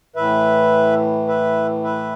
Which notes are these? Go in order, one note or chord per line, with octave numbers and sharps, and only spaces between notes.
A2 E3 B4 E5
B4 E5
B4 E5